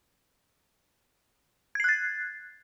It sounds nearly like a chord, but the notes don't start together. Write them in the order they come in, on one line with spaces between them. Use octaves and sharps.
G#6 C7 F#6 A6